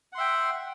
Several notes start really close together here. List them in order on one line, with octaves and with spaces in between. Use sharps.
F#5 C6 E5 G5